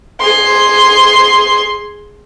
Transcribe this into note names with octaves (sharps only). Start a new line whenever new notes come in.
G#4 C6